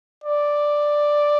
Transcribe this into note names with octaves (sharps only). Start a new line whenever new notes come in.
D5